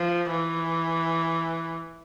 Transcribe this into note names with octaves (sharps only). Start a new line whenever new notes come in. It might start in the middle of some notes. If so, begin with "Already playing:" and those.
Already playing: F3
E3